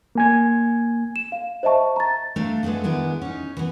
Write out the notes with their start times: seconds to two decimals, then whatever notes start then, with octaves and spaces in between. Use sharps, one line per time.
0.15 A#3 G#5 G#6
1.16 E7
1.32 F5
1.63 C5 D#5 E5 A5 C#6
1.96 A#5 A6
2.36 A3 D4 F5
2.63 G#3 A3 B3 C4 D4
2.84 D#3 G#3 B3 D4 E4
3.22 C#4 D#4
3.57 E3 B3